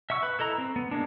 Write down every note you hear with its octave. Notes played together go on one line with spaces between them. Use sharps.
E5 F#5 C#6 E6
B4 B5
E4 A4 D#5 A#5
C4
B3
G#3 A#3 D4